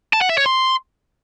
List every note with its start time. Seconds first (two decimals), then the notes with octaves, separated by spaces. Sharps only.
0.13 A5
0.21 F#5
0.30 E5
0.38 C#5
0.46 C6